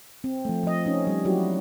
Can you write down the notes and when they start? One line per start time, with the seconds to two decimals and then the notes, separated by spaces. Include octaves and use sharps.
0.24 C4
0.45 F3 A3
0.63 F3 D#5
0.85 C#4 D#4
1.07 G3
1.25 F#3 E4 F#4 G4